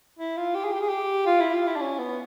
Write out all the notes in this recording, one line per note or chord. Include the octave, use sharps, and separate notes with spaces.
E4
F4
G4
G#4
G4
G#4
G4
F4
E4
F4
E4
D4
C#4
B3